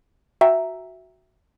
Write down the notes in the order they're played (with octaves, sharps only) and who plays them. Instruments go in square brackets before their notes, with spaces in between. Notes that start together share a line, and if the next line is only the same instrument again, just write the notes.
[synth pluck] F#4 E5 G5 A#5